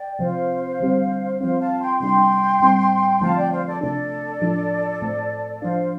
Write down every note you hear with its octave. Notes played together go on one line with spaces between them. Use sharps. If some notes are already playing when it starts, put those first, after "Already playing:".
Already playing: D5 G5
C3 F3 C4 C5 F5
D3 G3 C4
F3 C4 C5 F5
F5 A5
G5 C6
C3 G3 D4 G5 C6
A2 G3 C4
D3 F3 A3 C4 F5 A5
D5 G5
C5 F5
A4 D5
C3 A3 D4 A4 D5
A2 F3 D4
A2 A3 C4
F3 D4 C5 F5